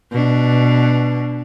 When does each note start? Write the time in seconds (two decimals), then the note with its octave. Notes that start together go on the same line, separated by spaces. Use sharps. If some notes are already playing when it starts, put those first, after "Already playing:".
0.11 B2 D4